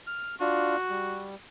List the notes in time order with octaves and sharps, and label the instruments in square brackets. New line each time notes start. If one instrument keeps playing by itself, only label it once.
[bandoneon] F6
[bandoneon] D4 F4 [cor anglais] F#4
[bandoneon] G3